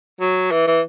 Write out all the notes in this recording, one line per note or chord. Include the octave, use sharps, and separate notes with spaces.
F#3
E3
E3